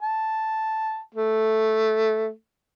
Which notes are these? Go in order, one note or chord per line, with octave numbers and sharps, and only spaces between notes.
A5
A3